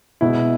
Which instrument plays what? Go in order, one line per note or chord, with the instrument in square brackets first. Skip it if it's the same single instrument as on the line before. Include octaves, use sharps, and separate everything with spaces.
[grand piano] B2 G#3 E4